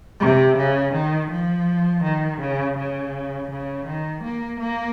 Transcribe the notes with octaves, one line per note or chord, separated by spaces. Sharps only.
C3
C#3
D#3
F3
D#3
C#3
C#3
C#3
D#3
A#3
A#3